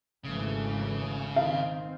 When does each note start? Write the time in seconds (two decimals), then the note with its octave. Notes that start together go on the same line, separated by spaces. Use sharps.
0.24 G#1 C#3 E3 A3
1.36 D#3 C4 F5